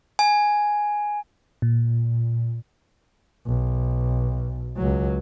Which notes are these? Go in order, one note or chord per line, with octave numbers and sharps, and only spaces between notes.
G#5
A#2
B1
C#2 F#3